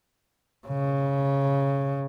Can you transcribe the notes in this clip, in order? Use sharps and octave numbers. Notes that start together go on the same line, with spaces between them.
C#3